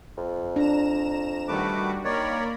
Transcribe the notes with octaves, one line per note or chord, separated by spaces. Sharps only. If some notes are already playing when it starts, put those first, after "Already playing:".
F2
D4 A#5 E7
D#3 G3 A3 F#4 B4 D6
D#3 A#3 A#4 C#5 D5 B5